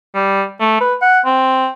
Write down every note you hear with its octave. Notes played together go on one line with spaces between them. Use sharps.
G3
A3
B4
F#5
C4